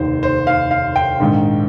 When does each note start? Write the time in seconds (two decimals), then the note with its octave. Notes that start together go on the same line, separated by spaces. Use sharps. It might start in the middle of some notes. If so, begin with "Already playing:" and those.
Already playing: F1 D#2 D#3 C5
0.23 C5
0.47 F5
0.71 F5
0.96 G5
1.20 A#1 G#2 D#3